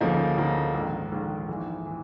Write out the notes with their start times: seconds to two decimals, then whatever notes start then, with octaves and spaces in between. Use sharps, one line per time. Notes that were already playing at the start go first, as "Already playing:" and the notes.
0.01 D2 C#3 F3 A#3 D#4
0.37 D2 C#3 F3 A#3 D#4
0.75 A#1 G#2 D#3
1.12 A#1 G#2 D#3
1.49 A#1 G#2 E3
1.86 E3